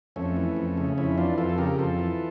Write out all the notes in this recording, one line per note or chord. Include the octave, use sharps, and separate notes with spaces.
F2 A3 C#4
E3
F2
C#3
F2 C#4 E4
E3 D4 F4
F2 F4 A4
A4
C#3 G4 A#4
F2 F4 A4
E3